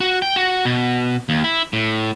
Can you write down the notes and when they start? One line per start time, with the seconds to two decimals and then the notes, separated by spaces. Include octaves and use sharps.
0.01 F#4
0.22 G5
0.36 F#4
0.65 B2
1.29 D#2
1.44 E4
1.73 A2